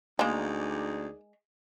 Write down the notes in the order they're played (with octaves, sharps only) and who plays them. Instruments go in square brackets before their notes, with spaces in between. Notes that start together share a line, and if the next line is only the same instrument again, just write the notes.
[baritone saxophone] D2 [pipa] G#3 [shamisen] A#3 A#5 [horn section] D#4 G#4 D5